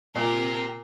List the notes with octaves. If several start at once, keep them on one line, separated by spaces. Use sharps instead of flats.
A#2 C4 G4 A#4